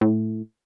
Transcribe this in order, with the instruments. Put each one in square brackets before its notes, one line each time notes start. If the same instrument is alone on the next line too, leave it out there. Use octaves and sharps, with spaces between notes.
[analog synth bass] A2